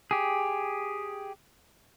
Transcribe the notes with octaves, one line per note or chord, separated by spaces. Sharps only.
G4 G#4